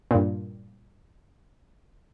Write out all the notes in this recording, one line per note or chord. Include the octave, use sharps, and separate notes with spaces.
G2 A#2